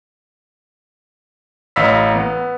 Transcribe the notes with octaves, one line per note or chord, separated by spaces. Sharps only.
A1 D#5 F5 B5 E6 B6
B3